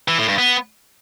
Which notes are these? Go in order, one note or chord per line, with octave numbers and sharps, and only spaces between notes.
E3
A2
G2
B3